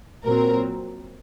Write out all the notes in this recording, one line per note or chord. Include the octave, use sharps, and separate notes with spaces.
A#2 F#3 C4 A#4